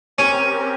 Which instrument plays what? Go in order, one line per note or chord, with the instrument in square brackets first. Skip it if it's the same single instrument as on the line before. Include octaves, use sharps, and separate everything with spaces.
[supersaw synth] C4 G4 A#4 [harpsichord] C#4